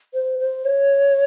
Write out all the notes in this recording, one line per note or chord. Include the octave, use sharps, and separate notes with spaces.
C5
C5
C#5